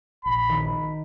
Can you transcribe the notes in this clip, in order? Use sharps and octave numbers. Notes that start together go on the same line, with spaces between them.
A#1 B5
D#3